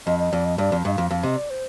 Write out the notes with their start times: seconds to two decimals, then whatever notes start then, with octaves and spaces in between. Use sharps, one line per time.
0.06 F2 D#5
0.19 D#5
0.33 F2 D5
0.45 D#5
0.58 G2 D5
0.72 F2
0.85 G2 D#5
0.94 F2 F5
1.10 F2 F5
1.23 C3 D#5
1.36 D5
1.50 C5